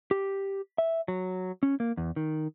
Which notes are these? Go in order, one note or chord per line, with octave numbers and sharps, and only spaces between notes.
G4
E5
F#3
C#4
A#3
E2
D#3